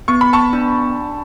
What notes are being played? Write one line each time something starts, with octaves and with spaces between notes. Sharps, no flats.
B3 C#6
B5
A5 C#6
D4